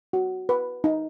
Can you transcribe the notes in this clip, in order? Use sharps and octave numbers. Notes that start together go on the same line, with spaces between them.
F#4
B4
D#4